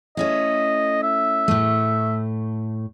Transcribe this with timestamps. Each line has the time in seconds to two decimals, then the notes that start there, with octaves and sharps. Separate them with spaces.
0.17 A3 C#4 E4 D#5
1.03 E5
1.48 A2 A3